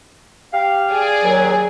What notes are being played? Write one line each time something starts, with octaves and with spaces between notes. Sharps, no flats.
G4 F5
G#4 D5
D#2 F#3